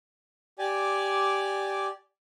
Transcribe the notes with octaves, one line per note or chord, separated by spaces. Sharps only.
G4 D5 G#5